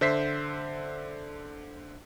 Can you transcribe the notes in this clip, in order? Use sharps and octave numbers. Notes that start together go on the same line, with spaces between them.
D3 C5 E5 B6 C7